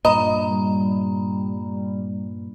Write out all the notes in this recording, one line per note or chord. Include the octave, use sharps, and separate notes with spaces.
G2 A#2 D#5 A#5 B5
G3